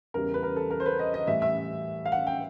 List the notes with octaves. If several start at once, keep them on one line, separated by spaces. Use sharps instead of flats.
E2 C#3 E3 G3 A#4
B4
A#4
A4
A#4
C5
B4
D#5
D#5
A2 E3 G3 E5
E5
F5
F#5
G5